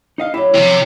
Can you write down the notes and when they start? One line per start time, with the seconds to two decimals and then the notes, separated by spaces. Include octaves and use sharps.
0.18 D#4 D#5 F5
0.34 F#3 E4 G4
0.54 C3 F3 E4